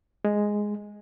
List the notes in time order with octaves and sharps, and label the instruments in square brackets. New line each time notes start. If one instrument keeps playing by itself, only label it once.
[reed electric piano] G#3